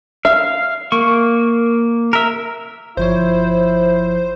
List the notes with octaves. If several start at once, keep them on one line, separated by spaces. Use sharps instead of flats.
E5 F5
A#3 C#6
A#4 E5
G1 F3 E4 C5 C#5